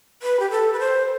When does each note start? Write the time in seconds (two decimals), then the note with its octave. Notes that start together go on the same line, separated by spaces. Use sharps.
0.23 B4
0.40 G4
0.51 A4
0.73 B4
0.80 C5